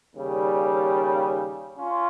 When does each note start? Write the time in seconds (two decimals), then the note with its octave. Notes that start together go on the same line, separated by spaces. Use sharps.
0.15 D#2 C#3 G3
1.79 C#4 F4